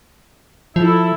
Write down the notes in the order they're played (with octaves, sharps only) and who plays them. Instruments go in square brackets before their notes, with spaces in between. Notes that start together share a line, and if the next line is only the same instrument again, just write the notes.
[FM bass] F3 [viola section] E4 A4